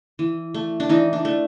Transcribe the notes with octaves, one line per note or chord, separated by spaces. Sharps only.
E3
A3
D4
E3 D#4
D4
A3